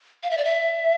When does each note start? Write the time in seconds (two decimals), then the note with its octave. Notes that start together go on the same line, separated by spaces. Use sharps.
0.23 F5
0.31 E5
0.37 D5
0.45 E5